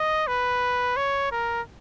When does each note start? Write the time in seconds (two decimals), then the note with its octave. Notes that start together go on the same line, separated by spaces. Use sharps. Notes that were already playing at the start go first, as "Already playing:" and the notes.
Already playing: D#5
0.27 B4
0.96 C#5
1.32 A#4